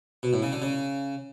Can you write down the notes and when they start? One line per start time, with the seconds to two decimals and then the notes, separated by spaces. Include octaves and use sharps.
0.23 B2
0.33 A2
0.42 C#3
0.52 D3
0.62 C#3